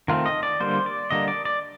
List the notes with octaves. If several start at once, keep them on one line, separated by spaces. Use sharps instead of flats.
D#3 A3 C4 F4
D#5
D5
D3 G3 A#3 C5
D5
D3 G3 A#3 D#5
D5
D5